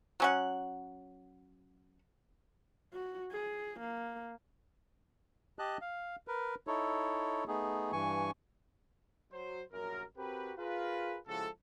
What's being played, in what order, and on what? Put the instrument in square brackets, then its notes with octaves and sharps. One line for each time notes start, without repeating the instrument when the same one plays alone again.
[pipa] F#3 C#4 F#5
[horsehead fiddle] F#4
G#4
A#3
[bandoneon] G4 D#5 A5 F#6
F5
A#4 B4
D#4 E4 A4 C#5
A3 B3 D#4 G#4
G2 E3 G#5 C#6
[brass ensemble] F#3 C5
A#1 F#2 F#3 C#4 A#4
C4 F#4 G4 A#4 B4
F4 G#4 A#4 B4
C#3 F3 G#3 E4 F#4 A4